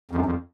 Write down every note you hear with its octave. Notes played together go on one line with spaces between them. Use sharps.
F2
F#2
F2